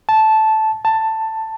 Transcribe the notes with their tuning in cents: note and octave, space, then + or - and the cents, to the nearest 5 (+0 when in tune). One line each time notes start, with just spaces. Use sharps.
A5 -10
A5 +10